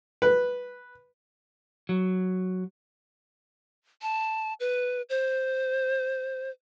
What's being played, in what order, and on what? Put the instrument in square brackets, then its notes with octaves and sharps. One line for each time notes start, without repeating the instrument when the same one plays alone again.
[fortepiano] B4
[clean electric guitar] F#3
[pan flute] A5
B4
C5